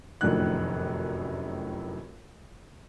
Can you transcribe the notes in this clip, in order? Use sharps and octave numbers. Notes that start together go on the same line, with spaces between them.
F1 A#1 F#2 A2 D#3 F#6